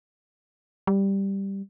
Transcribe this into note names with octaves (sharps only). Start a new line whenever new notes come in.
G3